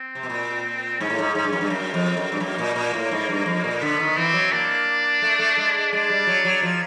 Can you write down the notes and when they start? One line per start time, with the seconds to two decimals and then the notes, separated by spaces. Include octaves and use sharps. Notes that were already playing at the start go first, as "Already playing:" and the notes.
Already playing: C4
0.15 C3
0.23 B2
0.30 A#2
1.00 G#2 C#4
1.10 A2
1.19 G#2
1.35 G#2
1.44 G2
1.52 F#2
1.61 G2
1.70 F#2 C4
1.94 F2
2.17 F#2
2.32 G2
2.40 F#2 A#3
2.58 A#2
2.75 A#2
2.94 A2
3.11 G#2
3.29 G2
3.46 F2
3.64 A#2
3.82 D3 B3
4.00 D#3
4.16 E3 C4
4.34 F#3
4.52 A#3 D4
5.22 A3
5.39 A3
5.57 G#3
5.93 G#3 D4
6.10 G3
6.27 F#3
6.45 F#3
6.62 F3